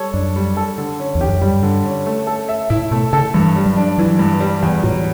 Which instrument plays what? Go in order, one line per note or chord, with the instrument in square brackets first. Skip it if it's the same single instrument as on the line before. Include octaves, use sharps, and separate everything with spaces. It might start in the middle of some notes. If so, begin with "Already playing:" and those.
Already playing: [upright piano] G3 A4 C#5
[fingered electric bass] F#2 [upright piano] D4
[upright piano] G3
A4
D3
C#4
[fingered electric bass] E2
[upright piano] G4
[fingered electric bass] F#2
[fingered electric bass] G2 [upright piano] G3
[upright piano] D3
C#4
A3
A4
E5
[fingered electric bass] A2 [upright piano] E4
[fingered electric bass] B2 [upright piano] A3
[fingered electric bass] C#3 [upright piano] A4
[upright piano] G2 [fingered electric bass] E3
[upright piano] G3
[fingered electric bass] F#3
[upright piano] D4
[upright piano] E3 [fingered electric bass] F#3
[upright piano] G2
G3
[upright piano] E2 [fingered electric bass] E3
[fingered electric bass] A2 [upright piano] F#3